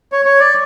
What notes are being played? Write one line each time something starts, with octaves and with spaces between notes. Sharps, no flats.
C#5
C#5
D5